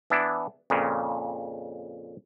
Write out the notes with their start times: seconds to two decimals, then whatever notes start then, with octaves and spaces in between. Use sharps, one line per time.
0.10 E3 B3 D4 E4
0.70 F2 A#2 C#3